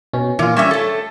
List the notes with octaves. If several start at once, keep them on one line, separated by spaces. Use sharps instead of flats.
B2 C#4
A#2 E3 F4
G3 C#4 C#5 E5
A3 A4